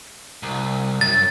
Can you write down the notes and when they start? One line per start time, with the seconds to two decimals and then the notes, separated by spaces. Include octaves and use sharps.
0.43 C2
1.01 F#2 A6